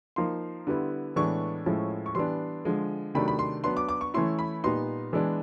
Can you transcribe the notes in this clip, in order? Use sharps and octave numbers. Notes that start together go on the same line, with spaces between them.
F3 A#3 D#4 C6
D3 G3 B3 E4
A2 E3 G#3 B3 D4 C#6
A2 F3 G#3 C#4 E4
C#6
E3 G3 B3 D4 C6
D3 F3 G#3
C3 D#3 F#3 A3 D4 B5
B5
C6
F#3 B3 D4 C6
D6
D6
C#6
E3 A3 C#4 E4 C6
B5
A#2 G3 B3 D#4 C6
E3 G#3 B3 D4